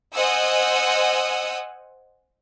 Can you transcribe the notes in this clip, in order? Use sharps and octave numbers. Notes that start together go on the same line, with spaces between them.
C5 D#5 F#5 G#5 D#6 E6